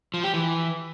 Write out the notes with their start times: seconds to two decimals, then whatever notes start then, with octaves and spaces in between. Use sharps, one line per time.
0.14 F3
0.24 G4
0.34 E3